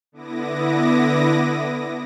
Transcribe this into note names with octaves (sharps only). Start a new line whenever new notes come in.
D3 B3 E4 D6 D#6 A#6